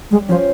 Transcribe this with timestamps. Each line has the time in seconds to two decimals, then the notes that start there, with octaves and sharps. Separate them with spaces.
0.11 G3 G#3
0.28 F3 C#4 F4 C5